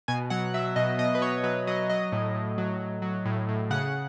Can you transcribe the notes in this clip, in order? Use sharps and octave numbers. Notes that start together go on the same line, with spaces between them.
B2 G#5
F#3 F#5
F#3 E5
B2 D#5
B2 D#5
B4
B2 C#5
F#3 B4
F#3 D#5
F#3 D#5
A2
A2
F#3
F#3
F#3
A2
A2
C#3 F#5